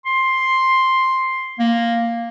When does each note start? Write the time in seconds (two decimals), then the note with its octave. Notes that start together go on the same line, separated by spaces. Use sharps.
0.06 C6
1.59 A#3